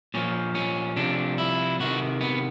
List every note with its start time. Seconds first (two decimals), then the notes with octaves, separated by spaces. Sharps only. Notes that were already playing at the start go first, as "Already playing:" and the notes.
0.14 A#2 F3 C#4
0.55 C#4
0.96 C3 F3 D4
1.38 E4
1.80 C3 D#3 F#4
2.21 B3